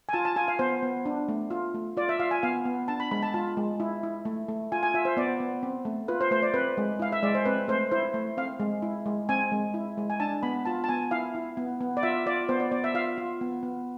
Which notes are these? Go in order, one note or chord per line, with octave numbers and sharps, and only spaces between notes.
G#5
F4 A5
A5
F4 G#5
F5
B3 C5
B3
D4
A3
F4
A3
F4 D5
E5
F4 F5
G#5
B3 F5
B3
D4 A5
B5
G#3 B5
A5
F4 A5
G#3
E4
E4
A3
A3
F4 G#5
G#5
F4 E5
C5
B3 D5
B3
C4
A3
F4 B4
C5
A3 C5
D5
C4 B4
G#3
E4 F5
E5
G#3 D5
C5
C4 B4
A3 C5
E4 C5
A3
C4 F5
G#3
E4
G#3
C4 G#5
G#3
E4
G#3
G#5
D4 A5
B3 B5
F4 A5
A5
B3 G#5
E4 F5
E4
B3
B3
D5
F4 E5
F4 D5
B3 C5
D5
B3 D5
E5
F4 F5
F4
B3
B3